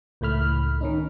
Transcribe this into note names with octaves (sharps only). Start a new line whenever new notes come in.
C#2 A2 A3 B5 F6
D#3 C#4 D#4